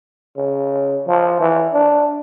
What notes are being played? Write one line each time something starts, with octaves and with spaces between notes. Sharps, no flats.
C#3
F3
E3
D4